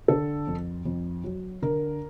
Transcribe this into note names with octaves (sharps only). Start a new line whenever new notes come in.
D3 A4
F2
F2
F#3
D3 A#4